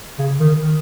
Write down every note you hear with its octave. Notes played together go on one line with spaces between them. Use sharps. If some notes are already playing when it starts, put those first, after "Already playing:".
C#3
D#3
D#3